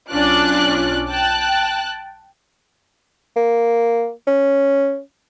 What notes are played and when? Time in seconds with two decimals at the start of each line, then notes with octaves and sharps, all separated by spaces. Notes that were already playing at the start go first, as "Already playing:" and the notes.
0.11 B1 C#4 D4 F4 D5 F#6
1.09 G5 A5 F#6
3.36 A#3
4.27 C#4